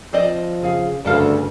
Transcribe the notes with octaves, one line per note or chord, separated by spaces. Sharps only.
F3 C4 D5 D#5
C#3 G#4 F5
D2 G2 C#3 D4 A4 F5 A5